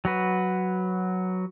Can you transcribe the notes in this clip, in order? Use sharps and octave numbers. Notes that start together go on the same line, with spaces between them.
F#3 F#4 B4